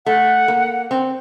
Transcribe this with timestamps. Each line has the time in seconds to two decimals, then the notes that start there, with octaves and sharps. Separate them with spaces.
0.06 A3 F#5
0.48 A#3
0.91 C4